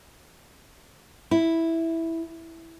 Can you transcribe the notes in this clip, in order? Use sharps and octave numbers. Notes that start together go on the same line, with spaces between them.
E4